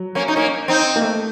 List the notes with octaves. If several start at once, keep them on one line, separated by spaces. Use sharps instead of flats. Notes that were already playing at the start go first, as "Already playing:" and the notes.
Already playing: F#3
A#3 C#4
D#4
A#3 C#4
C4 D#4
A#3
A3